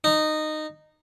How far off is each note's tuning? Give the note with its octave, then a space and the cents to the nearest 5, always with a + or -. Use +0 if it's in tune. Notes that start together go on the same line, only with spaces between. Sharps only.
D#4 -15